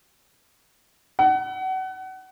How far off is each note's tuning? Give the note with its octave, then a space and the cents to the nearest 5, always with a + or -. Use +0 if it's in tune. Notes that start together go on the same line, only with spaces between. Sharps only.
F#5 +30